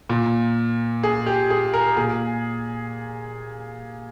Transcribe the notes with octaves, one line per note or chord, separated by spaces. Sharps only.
A#2
G#4
G4
G#4
A#4
A#2 G#4